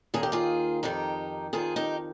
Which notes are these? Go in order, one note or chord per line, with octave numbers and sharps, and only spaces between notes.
D#2 D#3 G#4
G4
F4 G#4
F2 D#3 D#4 G4
F2 D#3 F4 G#4
D#4 G4